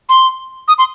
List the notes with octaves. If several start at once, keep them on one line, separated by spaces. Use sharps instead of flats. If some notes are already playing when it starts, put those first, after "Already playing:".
C6
D#6
C6